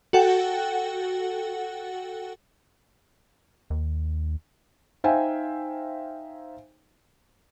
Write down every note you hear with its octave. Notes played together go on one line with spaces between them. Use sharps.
F#4 A4 F#5 G5
D#2
D#4 C5 E5 F5 G5 G#5